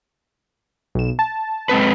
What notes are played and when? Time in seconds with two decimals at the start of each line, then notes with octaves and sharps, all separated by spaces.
0.95 B1 E7
1.19 A5
1.69 G#3 C4 B4